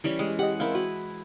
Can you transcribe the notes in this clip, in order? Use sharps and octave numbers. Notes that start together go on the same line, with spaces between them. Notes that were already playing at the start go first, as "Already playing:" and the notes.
E3 G3 C#4
G#3 G4
G4 D#5 F#5
C4 E4 A#4 D#5 F5
F#4 B4